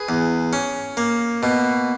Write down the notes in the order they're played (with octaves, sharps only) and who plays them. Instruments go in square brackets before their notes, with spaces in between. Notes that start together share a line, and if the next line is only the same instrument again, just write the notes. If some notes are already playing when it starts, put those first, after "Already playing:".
Already playing: [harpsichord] G#4 B4
E2
C#4
A#3
B2